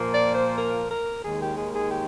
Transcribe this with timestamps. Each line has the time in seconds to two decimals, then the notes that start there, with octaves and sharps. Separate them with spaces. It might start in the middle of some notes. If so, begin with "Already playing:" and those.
Already playing: A#2 F3 A#3
0.12 D5
0.35 C5
0.57 A#4
0.91 A#4
1.24 D#2 D#3 G#3 G#4
1.41 G4
1.57 G#4
1.74 G#4
1.91 G4